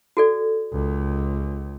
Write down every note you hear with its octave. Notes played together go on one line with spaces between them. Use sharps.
F#4 A4 D5
C#2